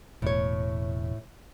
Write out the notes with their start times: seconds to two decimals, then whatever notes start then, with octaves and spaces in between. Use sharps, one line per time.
0.22 E1 A2 C#5